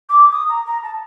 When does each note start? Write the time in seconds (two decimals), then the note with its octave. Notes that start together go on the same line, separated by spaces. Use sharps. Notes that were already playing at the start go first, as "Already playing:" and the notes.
0.09 D6
0.32 D#6
0.49 A#5
0.66 A#5
0.83 A5